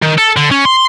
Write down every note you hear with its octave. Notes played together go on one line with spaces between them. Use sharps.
D#3
A4
D3
C#4
C6